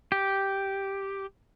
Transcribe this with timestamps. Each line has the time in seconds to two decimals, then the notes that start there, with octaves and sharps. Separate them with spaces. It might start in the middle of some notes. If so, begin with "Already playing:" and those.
0.12 G4